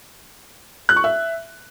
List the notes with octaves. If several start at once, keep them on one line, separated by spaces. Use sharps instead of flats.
F#6
C#6
E5